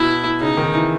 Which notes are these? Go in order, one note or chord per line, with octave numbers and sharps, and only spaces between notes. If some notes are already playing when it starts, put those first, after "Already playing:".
Already playing: B2 E4
C#3 D#4
D#3
E3